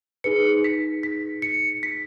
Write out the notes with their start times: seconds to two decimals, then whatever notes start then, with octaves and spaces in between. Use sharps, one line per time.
0.24 D#4 G#4 B4 C#7
0.64 B6
1.03 B6
1.42 C#7
1.83 B6